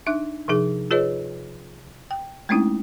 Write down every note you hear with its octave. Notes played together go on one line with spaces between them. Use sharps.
D4 D#4 E5 F#6
C3 F3 D#4 G#4
F4 G#4 B4 C#5 D#5
G5
G#3 A3 C4 C#4 D#4 E4